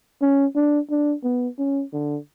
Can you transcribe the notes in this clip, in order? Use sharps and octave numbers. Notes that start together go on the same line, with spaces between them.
C#4
D4
D4
B3
C#4
D3